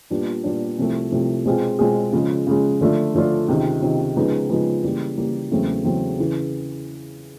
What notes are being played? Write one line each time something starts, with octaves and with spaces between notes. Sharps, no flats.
A#2 G3 B3 D4
A#2 G3 B3 D4
C2 C3 F3 A3
C2 C3 F3 A3
B2 G#3 C4 F4 G#4
B2 G#3 C4 F4 G#4
C#3 F3 G#3
C#3 F3 G#3
D3 F3 A3 D4 F4
D3 F3 A3 D4 F4
C#2 C3 D#3
C#2 C3 D#3
C#3 F3 G#3 B3 D#4
C#3 F3 G#3 B3 D#4
C#3 E3 G3 A#3
C#3 E3 G3 A#3
E2 C#3 F#3 A3 C4
E2 C#3 F#3 A3 C4
C#3 E3